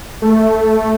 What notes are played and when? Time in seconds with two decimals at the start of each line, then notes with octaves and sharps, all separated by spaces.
0.22 A3